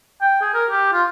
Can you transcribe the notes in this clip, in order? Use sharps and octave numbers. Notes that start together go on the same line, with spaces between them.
G5
G#4
A#4
G4
F4